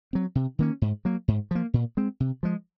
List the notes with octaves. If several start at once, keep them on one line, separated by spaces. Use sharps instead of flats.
F#3 C4
C3
D#3 A#3 C#4
G#2
F#3 A#3
G#2
F3 A#3
A#2
G#3 C4
C3
F3 G#3